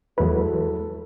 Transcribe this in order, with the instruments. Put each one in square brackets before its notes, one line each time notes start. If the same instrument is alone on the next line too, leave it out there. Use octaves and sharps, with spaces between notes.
[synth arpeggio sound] E2 B4 [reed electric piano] F#3 G#3 E4 [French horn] A4